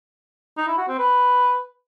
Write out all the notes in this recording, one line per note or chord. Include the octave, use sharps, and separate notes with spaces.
D#4
E4
F#4
C4
B4